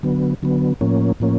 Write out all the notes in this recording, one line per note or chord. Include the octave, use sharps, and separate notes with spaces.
D3 F#3 B3
D3 F#3 B3
A2 F3 A#3 C#4
A2 F3 A#3 C#4